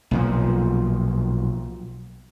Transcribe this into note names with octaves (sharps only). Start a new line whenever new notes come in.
B1 A#2 F3